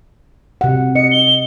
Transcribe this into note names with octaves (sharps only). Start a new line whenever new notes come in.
C3 F#5
D#5 C#7
G7